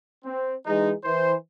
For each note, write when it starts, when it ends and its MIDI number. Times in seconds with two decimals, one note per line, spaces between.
0.25 0.54 60
0.66 0.92 52
0.66 0.92 56
0.66 0.92 63
1.04 1.34 52
1.04 1.34 72